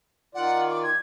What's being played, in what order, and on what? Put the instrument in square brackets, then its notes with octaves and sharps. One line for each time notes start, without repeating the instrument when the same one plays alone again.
[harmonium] D#3 F4 D5 [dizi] F#5
[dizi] D6
G#6